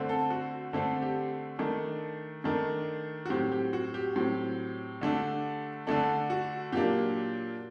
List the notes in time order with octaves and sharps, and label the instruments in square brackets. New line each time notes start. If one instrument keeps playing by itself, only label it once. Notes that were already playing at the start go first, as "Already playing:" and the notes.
Already playing: [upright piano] D3 A3 C4
A4
F#4
D3 A3 C4 A4
G4
D#3 A3 D4
D#3 A3 D4
F#4
A2 F#3 C4 G4
G4
F#4
G4
A2 F#3 C4
D3 A3 D4
D3 A3 D4 A4
F#4
A#2 F#3 A#3 D4 G4